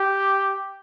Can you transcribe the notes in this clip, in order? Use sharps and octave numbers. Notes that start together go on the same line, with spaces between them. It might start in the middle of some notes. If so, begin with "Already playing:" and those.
Already playing: G4